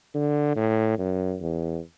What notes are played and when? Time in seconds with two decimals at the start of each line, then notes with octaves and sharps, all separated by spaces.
0.14 D3
0.56 A2
0.98 F#2
1.41 E2